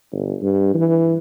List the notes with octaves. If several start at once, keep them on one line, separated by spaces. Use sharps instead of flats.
G1
G2
E3